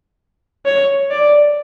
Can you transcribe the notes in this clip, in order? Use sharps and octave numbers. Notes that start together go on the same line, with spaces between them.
C#5
D5